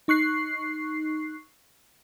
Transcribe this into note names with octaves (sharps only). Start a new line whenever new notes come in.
D#4 C#6 F#6 C7